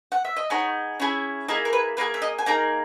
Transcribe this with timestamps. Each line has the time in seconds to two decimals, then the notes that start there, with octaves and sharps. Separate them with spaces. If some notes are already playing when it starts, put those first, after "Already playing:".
0.12 F#5
0.25 E5
0.36 D#5
0.50 B3 D#4 G#4 C#5
1.00 C#4 E4 G#4
1.48 A#3 E4 G#4 D#5
1.65 A#4
1.73 B4
1.97 A#3 E4 G#4 B4
2.14 E5
2.22 D#5
2.38 G#5
2.46 A#3 D#4 G#4 A#5